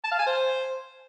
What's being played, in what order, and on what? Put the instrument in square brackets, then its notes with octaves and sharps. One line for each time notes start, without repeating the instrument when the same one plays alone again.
[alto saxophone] A5
F5
G#5
C5